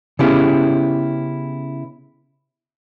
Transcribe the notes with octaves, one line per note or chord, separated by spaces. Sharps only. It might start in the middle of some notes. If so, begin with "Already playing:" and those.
C#3 B3 C#4 E4 G4